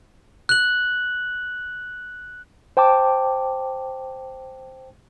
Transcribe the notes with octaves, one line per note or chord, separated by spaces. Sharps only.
F#6 F#7
C5 G5 A5 D6